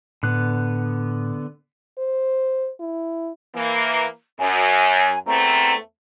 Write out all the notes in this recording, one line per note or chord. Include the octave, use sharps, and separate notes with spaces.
A2 D3 B3 F#6
C5
E4
E3 A#3
F#2 G#5
E2 A3 C4 A#5